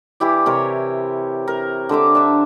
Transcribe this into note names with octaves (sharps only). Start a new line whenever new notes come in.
E3 E4 G4 D5
C3 A#4 C#5
A#4
D3 C5 E5 D6
D4 E5